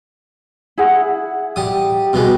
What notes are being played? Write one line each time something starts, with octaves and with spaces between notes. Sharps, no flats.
E4 G#4 F#5
G3 D#6
B2 G3 G#3